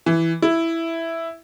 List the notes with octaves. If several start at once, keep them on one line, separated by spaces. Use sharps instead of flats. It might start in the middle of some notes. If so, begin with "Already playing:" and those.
E3
E4